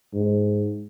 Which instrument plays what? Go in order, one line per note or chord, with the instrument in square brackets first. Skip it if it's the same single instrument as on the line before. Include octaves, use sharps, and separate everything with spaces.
[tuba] G#2